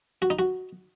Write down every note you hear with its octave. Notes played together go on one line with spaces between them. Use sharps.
F#4
D#4
F#4